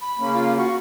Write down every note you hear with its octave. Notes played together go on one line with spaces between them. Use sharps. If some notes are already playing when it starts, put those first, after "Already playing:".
B5
C#3 A#3 C#4
F4
F#4 C#6